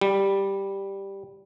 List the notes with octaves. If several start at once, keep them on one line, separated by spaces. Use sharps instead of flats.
G3